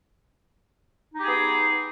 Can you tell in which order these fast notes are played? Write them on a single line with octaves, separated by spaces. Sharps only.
D#4 G4 G#4 B3